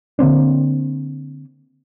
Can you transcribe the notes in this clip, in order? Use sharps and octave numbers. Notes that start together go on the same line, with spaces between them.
D3 A#3 C4 D4